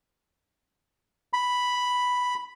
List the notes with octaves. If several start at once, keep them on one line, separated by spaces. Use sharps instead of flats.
B5